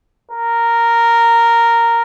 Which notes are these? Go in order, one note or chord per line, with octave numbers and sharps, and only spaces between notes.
A#4